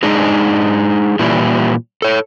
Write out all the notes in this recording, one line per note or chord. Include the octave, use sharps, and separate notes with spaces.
G#3 D4 D#4 G#4
A#2 E3 G3 E4
A4 C#5